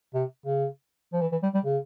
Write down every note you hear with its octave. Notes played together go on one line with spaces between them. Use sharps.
C3
C#3
F3
E3
E3
G3
G3
C#3